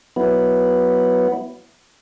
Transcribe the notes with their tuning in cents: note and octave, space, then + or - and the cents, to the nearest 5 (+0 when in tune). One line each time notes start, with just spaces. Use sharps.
F#3 +0 B3 +0 E4 +0